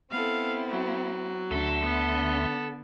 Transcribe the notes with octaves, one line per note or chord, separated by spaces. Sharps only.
B3 C4 E4 A4 F5
F#3
D2 D3 A4 E5 C6
B3